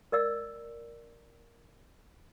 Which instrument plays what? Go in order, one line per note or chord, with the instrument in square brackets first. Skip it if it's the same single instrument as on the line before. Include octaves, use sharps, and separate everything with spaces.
[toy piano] A#4 D5 D#5 E6